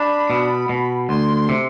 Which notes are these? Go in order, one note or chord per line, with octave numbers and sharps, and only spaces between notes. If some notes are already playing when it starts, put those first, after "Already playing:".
Already playing: D4 B5
B2
B2
D2 C6
C3